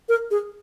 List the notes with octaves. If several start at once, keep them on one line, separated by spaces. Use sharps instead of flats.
A#4
G#4